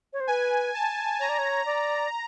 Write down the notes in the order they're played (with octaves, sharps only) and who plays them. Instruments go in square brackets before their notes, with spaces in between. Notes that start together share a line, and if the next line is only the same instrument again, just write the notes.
[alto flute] C#5
C5
[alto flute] B4 [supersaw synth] G#5
[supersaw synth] A5
[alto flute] C#5 [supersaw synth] A#5
[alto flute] D5
C#5
D5